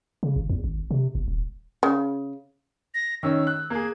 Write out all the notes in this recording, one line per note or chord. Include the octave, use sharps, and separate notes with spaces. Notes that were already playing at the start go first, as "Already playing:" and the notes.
C#3
G#1
E2
G#1
C3
G1
D#1
C#3
A#6
D#3 C#4 E6
F#6
A#3 G#4 G#6